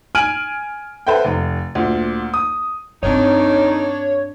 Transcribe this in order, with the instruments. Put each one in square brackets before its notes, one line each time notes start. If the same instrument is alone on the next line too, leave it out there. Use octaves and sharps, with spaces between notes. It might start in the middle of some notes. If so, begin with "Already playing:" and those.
[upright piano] G#5 F6 G#6 D7 D#7 F#7
A4 B4 C5 E5 F#5 G5
F1
D2 A#2
D#6
[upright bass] G2 C4 [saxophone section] D#3 A3 D#4 [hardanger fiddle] D4 [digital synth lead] C#5